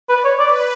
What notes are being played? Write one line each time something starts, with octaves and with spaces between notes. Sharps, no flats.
B4 D5
C#5
B4 D5